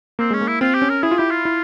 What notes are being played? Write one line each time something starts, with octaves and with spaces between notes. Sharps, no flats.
A#3 C4
G#3 C#4
A#3
E4
C4 F4
G4
C#4
A#4
E4 G#4
F4
E4 G4
F4
E4